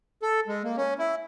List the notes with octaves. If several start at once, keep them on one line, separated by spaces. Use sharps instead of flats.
A4
G#3
A#3
C#4
E4